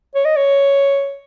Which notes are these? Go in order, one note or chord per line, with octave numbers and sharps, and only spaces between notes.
C#5
D#5
C#5